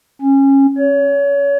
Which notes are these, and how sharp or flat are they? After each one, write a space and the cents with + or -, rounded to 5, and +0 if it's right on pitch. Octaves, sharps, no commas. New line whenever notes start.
C#4 -20
C#5 +30